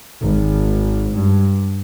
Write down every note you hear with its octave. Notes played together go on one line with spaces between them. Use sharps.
G#1
G2